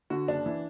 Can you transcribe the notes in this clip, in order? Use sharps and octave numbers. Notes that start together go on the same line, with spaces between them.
D3 F#4
F#1 D4
E3